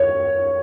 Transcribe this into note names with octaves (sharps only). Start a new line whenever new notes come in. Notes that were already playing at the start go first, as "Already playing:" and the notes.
Already playing: C#5